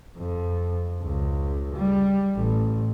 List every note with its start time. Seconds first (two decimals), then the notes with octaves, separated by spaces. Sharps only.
0.18 F2
1.02 C#2
1.75 G3
2.35 A1